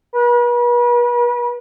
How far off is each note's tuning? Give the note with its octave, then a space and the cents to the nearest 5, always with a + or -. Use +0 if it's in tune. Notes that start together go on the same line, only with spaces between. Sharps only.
B4 -40